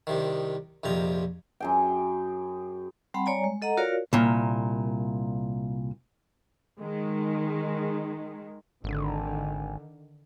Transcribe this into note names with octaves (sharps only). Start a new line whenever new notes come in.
C2 C3 D#3
A#1 F2 C3 A#5
F#2 G#4 G5
G3 C4 F#5 A5 B5
G3 C#5 D5 G#5 A#5
G#3
A4 D#5 F#5 A#5
F4 F#4 A#4 C#5 D5 F5
C2 A#2
D#3 G#3
G#1 D3 D#3